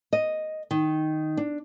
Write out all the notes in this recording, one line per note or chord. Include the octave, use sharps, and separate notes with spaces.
D#5
D#3
D4